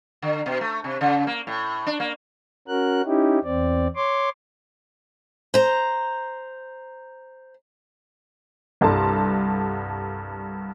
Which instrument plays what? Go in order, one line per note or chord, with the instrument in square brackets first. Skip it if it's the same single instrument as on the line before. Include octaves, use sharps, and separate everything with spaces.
[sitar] D3
B2
A3
C3
C#3
A#3
A2
D4
A#3
[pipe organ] C#4 F#4 A#4 F#6
C#4 D#4 E4 G4
E2 C4 D5
C#5 C6 D6
[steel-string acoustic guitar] C5 A#5
[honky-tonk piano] C2 G2 A4 A5 C6